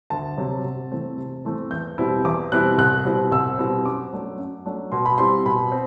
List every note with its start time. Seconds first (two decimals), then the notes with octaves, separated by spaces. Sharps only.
0.10 D2 A5
0.37 C3 F#3
0.64 C3
0.91 E3 A3 C4
1.18 C3
1.45 E3 A3 C4
1.71 E2 G6
1.98 B2 G3 C4 E4
2.25 E2 D6
2.51 B2 G3 C4 E4 F#6
2.78 C2 F#6
3.05 B2 G3 C4 E4
3.32 C2 E6
3.58 B2 G3 C4 E4
3.85 F#2 D6
4.12 F#3 A3 D4
4.38 F#2
4.66 F#3 A3 D4
4.92 B2 C6
5.06 B5
5.18 G3 C4 E4 C6
5.46 B2 B5
5.72 C4